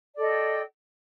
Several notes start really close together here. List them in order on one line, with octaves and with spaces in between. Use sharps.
D5 A4 D#5 G5